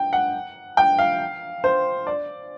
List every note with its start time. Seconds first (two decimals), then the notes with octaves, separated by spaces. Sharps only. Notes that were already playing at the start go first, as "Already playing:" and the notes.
Already playing: G5
0.13 F#5
0.77 G5
0.99 F5
1.64 C5
2.07 D5